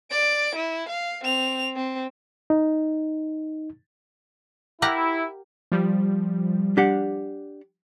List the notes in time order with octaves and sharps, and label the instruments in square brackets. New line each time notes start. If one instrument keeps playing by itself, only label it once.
[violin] D5 D7
E4
F5
C4 F7
C4
[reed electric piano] D#4
[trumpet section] E4 [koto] G4 A#4 F#5
[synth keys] F3 G3
[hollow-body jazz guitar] D4 G4 F#5